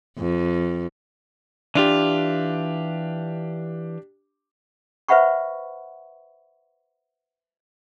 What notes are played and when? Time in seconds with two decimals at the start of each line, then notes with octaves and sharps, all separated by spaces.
0.18 F2
1.75 E3 D4 F4 G4
5.08 B4 C5 E5 F#5 B5 C#6